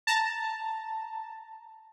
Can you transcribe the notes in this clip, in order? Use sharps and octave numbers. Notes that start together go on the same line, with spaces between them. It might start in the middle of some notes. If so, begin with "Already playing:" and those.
A5 A#5